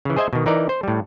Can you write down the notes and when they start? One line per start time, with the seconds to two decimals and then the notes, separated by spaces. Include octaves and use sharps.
0.05 C#3 E3
0.16 G#4 C5 D#5 E5 G#5
0.33 B2 D#3
0.46 E3 D#4 A#4 D5
0.69 C5
0.83 A2 G3